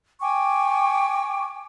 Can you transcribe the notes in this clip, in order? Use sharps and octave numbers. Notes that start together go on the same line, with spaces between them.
G5 G#5 C#6 D6